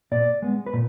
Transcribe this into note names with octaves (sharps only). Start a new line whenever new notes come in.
A#2 D5
G#3 B3
B4
A#2